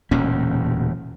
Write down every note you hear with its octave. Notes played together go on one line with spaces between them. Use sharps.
E1 D2 A#2 C#4